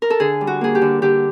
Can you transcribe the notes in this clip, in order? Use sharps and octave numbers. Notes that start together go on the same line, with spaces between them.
A#4
A4
D3 G#4
G3
F#4
A#3 G#4
G4
D3
D3 G4